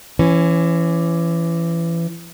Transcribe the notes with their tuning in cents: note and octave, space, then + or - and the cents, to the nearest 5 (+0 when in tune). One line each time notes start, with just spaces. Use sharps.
E3 +25 C#4 +0